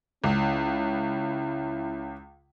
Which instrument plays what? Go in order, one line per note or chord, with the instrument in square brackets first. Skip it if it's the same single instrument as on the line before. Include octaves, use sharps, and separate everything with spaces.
[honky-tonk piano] C#2 [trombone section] C#4 E4